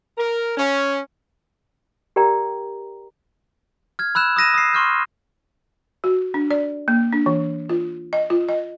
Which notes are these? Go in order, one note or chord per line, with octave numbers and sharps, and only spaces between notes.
A#4
C#4
G4 A#4 D5 G5 A#5
F6 G#6
B5 E6 F#6 E7
D#6 E6 A#6 D#7 E7
D#6 C7
C6 C#6 F6 G6
F#4
D4
D5
A#3
D4
E3
F4
D#5
F4
D#5